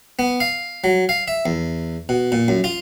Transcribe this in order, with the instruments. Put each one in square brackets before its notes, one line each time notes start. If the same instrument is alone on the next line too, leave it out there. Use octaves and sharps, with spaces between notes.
[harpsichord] B3
F5
F#3
F5
E5
E2
B2
A#2
F#2
F4